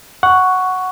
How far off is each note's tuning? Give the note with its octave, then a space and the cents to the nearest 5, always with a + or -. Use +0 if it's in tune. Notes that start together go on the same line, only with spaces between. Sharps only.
F#5 +0 C#6 +5